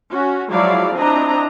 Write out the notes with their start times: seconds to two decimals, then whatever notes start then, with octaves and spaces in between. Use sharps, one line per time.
0.11 C#4 F#4
0.51 F3 F#3 G#3 E4 D5 F5
0.97 C4 D4 E4 D#5 A#5